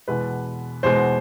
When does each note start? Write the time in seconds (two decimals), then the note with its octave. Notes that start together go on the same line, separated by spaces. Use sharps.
0.08 E2 B2 G#3 B4
0.83 E2 B2 G#3 C5